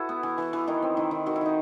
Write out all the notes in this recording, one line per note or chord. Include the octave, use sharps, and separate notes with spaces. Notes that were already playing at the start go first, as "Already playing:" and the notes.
Already playing: E4 F#4 A4 B4
B3
E3
E3
E3
D#3 D#4
C4
D#3 E4
D#3
D#3 F#4
E4
D#3 D#4